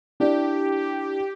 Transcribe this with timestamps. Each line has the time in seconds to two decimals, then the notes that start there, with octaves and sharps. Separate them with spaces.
0.20 D4 E4 G4 D5